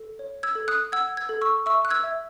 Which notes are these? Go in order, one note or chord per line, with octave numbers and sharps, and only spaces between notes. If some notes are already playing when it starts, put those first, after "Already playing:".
Already playing: A4
C#5
E6 G#6
A4
D#6 F#6
F#5 E6 G#6
E6 G#6
A4
C#6 E6
E5 C#6 E6
F#6
E6 G#6
E5